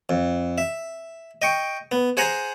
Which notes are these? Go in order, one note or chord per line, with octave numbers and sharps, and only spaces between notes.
F2
E5
D#5 G5 C#6
B3
G#4 C5 F#5 G#5 A#5